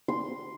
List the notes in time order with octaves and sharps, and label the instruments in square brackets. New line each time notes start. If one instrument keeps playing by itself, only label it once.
[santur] C6